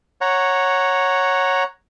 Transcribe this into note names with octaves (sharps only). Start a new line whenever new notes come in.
C#5 F#5 A#5